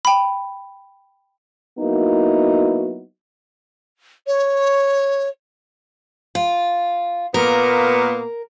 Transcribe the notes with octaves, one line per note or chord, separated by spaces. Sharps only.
G5 B5
F#3 A#3 B3 D#4 E4 F#4
C#5
F4
A#2 A#3 B3 A#4